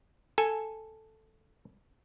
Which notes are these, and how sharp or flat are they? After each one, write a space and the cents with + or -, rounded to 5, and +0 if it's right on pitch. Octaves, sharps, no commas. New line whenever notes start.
A4 +0 G#5 +0